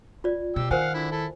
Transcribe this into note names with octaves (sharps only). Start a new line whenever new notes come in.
F4 D5
B2 G4 E6
D#3 A#4 C5 F5 F#5 G#5
D3 E4
E4 A4